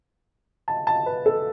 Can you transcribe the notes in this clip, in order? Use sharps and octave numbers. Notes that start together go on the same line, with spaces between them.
A5
A5
B4
A4